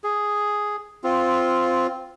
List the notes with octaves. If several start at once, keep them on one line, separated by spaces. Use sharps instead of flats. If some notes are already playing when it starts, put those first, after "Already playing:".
G#4
C4 F4